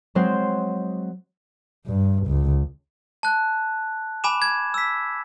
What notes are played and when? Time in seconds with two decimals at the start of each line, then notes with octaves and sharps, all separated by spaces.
0.15 F#3 G#3 C4 C5
1.86 G2
2.27 C#2
3.23 A5 F#6
4.24 G#5 B5 D6 E7
4.42 G#6
4.74 E6 B6